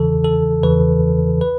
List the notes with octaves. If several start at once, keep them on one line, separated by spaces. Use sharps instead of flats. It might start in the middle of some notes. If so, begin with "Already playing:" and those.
Already playing: E2 C#3 E3 A4
A4
E2 C#3 E3 B4
B4